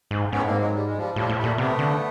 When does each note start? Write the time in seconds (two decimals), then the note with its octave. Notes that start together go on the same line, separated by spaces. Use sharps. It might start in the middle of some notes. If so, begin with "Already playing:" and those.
0.11 G#2
0.32 G#2 B3 C#4
0.39 A2
0.46 G#2 A#3 C4
0.60 F#3 G#3
0.74 G3
0.86 G#3
0.97 F3 G3
1.16 A2 F3 G3
1.30 A2
1.37 G3 A3
1.44 A#2
1.58 C3 A3 B3
1.79 D3